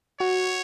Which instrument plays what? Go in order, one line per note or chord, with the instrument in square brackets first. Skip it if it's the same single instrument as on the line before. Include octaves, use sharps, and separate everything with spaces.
[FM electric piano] F#4 [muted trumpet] C#5